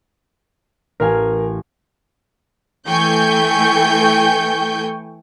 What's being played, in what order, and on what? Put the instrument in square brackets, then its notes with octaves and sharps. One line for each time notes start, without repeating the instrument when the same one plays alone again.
[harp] A1 F5 G#5 [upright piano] A#4
[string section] E3 A3 G5 G#5 C#6 G6